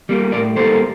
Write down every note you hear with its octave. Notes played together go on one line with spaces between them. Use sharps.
G3 A#3
A2 A#4 D5
G3 A#3 A4 C5